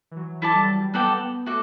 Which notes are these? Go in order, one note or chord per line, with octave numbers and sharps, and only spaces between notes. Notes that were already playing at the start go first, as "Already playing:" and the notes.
E3
F#3
F#3 E4 A4 D5 A5
G3
G3
B3 F#4 A4 D5 G5
B3
A3 F#4 A4 D5